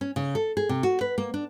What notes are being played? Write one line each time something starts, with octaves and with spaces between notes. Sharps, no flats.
C#4
C#3
A4
G#4
C3
F#4
B4
A#3
D4